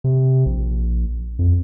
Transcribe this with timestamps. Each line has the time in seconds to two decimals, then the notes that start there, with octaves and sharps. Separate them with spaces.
0.04 C3
0.46 A#1
1.39 F2